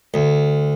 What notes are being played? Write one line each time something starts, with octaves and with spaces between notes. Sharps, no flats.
D2